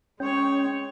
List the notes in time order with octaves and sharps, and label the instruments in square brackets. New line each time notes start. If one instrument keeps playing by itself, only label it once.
[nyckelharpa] G#3 C#5 [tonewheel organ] C#4 G5